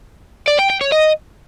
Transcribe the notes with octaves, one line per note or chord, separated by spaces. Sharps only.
D5
G5
G5
C#5
D#5